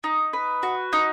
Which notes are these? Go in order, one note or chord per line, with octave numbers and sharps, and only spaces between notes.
D#4
B4
F#4
D#4